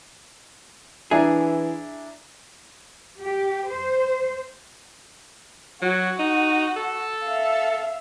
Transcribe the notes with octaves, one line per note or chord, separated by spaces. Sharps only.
E3 D4 E4 G#4 A#5
G4
C5
F#3 F#4
D#4
A4
E5 F5